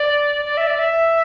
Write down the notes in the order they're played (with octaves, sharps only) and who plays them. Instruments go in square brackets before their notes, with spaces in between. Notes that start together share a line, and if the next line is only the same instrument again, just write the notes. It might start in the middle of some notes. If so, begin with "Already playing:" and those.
Already playing: [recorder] D5
D5
E5
D5
E5